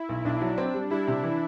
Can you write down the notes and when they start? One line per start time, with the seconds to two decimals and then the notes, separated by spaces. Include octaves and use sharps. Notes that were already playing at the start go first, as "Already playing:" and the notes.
Already playing: E4
0.09 B1
0.25 B1 D4
0.41 F#3
0.58 C4
0.74 G3
0.90 G3 E4
1.07 C3
1.23 E3